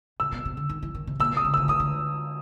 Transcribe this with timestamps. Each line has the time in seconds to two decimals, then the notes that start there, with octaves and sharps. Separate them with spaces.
0.20 C3 E6
0.32 B2
0.45 C3
0.57 D3
0.69 D#3
0.83 E3
0.95 D#3
1.07 C3
1.20 A#2 E6
1.32 C3
1.37 D#6
1.45 C#3
1.54 D3 E6
1.68 D#3 D#6
1.80 D3